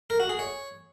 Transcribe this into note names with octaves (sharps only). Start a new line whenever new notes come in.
A#4
F#4
G#4
C#5